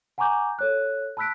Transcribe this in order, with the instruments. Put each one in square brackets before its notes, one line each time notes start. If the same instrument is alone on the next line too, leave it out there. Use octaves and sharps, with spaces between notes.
[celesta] F#5 G#5 A#5 C#6 D6 G6
A4 C#5 F#6
A5 B5 E6 F#6 B6 D7